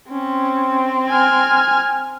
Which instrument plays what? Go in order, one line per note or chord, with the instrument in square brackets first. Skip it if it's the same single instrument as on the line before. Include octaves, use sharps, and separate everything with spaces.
[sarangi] C4 [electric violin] C#4
[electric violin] G#5 F6